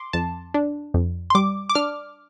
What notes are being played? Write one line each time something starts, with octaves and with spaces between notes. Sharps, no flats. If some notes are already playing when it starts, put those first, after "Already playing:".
Already playing: C6 D6
F2 A5
D4
F2
C6
G3 D6
D6
D4 F6